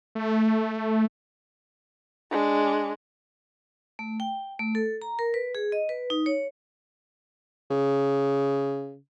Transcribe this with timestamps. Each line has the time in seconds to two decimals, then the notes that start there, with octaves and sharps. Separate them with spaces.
0.15 A3
2.31 G#3 D4
3.99 A3
4.20 G5
4.59 A3
4.75 A4
5.02 A#5
5.19 A#4
5.34 B4
5.55 G#4
5.72 D#5
5.89 B4
6.10 D#4
6.26 C#5
7.71 C#3